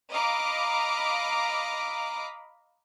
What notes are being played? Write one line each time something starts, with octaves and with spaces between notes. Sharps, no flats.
D#5 F5 A#5 B5 D6